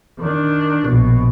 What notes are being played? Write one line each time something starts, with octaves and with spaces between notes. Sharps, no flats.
D#3 D4
A#1 B2